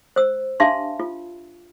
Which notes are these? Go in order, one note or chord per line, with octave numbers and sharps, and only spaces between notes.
C5 E6
D4 G4 E5 F5 A5 C6
F4